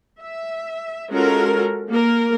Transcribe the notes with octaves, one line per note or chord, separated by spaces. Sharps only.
E5
G#3 C#4 F4 F#4 A4 A#4
A#3 A#4